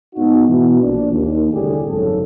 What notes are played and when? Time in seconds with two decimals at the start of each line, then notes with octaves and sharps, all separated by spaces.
0.14 G#2 B3 D#4 F#4
0.45 B2 E3
0.80 A#1 D4
1.10 D#2
1.51 C2 A2 D3 G4 G#4
1.86 G#1 F#2 C#3 A4